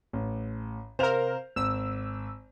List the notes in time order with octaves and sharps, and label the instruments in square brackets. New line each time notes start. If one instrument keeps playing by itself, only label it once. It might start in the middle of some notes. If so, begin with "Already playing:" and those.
[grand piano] A1
[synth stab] C3 A#4 [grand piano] C5 F5 F7
[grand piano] G#1 [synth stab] E6